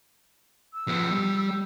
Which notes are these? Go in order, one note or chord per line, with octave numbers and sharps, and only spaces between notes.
E6
F3 B3
G3